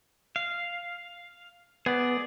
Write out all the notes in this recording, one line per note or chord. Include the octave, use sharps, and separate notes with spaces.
F5
B3 G#4 D5